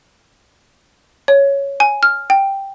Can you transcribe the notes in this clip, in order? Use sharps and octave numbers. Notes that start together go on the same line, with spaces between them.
C#5
G#5
F6
G5